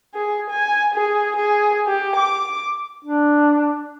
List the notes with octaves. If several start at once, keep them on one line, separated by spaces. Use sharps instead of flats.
G#4
G#5
G#4
G#4
G4
D6
D4